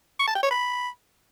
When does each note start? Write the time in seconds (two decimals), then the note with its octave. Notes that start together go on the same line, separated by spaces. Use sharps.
0.19 C#6
0.27 A5
0.35 G5
0.43 C#5
0.50 B5